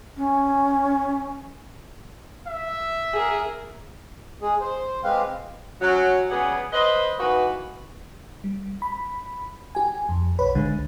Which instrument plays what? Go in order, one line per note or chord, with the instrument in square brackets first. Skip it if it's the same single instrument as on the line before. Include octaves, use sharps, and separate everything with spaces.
[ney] C#4
[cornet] E5
[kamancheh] G#4 A#4
[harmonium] G#3 G#4
C5
G#3 C4 G4 B4 F5
[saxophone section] F#3 C#4 F#4
C#3 G3 B3 G#4 B4 F#5
B4 C5 D#5
E3 A#3 D#4 F#4 B4
[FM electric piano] G3
B5
G4 G#5
F2
B1 B4 C#5 B5
G#1 C#2 D3 G#3